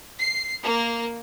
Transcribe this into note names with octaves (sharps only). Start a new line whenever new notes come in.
C7
A#3